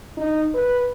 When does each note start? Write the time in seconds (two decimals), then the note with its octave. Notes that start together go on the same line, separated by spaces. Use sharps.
0.17 D#4
0.54 B4